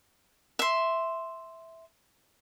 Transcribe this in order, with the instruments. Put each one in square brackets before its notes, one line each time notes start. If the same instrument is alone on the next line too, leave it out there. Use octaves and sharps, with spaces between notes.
[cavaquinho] E5 C6